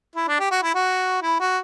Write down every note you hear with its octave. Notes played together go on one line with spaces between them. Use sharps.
E4
D4
G4
F#4
E4
F#4
E4
F#4